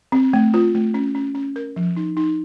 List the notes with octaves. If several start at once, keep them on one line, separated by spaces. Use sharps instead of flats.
C4
A3
F4
A3
C#4
C#4
C#4
A#4
F3
D#4
D#4